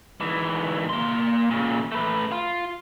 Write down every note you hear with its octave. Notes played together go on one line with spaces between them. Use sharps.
G#2 E3
A#3 C6
A#2 C#3
A3 B4
F4